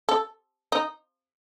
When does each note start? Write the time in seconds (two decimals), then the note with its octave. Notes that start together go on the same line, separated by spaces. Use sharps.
0.09 A4
0.72 D#4